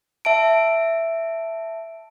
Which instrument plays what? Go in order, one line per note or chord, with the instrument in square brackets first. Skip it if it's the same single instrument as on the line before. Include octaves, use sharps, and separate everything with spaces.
[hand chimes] E5 A5 D7